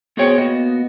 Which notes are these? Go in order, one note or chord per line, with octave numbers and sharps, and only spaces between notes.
B3 F#4 G#4 C5 C#5 G5
A#3 B3 F#4 D#5